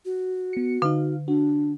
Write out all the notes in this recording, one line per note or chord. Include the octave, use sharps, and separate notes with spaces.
F#4
B3 C#7
D3 D#4 F5
D4 F#4